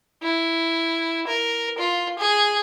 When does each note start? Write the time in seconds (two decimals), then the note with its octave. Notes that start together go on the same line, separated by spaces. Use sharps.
0.23 E4
1.27 A#4
1.78 F4
2.19 G#4